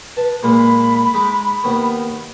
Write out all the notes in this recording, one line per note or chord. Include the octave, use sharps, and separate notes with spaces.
B4 A5
A#2 G#3 A#3 B5
G#3 D#4 D6
D#2 D#3 B3